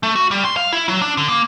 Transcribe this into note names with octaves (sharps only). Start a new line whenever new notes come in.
A3
F#4
G3
C6
F5
E4
F#3
D4
D3
A#3